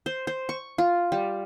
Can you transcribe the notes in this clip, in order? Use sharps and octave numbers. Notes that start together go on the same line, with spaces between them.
C5
C5
C#6
F4
G3